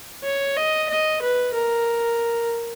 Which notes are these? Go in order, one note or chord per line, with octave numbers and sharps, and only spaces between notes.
C#5
D#5
D#5
B4
A#4